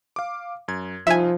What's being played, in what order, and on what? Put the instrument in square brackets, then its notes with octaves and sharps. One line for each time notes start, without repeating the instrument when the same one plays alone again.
[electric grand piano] F5 D6
F#2 G#6
[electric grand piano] C2 D#4 F4 [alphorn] F3 [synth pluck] E5 G#5